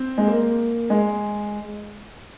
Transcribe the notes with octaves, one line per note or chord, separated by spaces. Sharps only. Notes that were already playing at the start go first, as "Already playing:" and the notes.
Already playing: C4
G#3
A#3
G#3